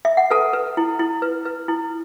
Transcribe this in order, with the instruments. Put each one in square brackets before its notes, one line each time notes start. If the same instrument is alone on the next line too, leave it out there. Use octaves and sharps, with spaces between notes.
[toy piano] E5
F#5
A4 B4 A5
B4
E4
E4
B4
B4
E4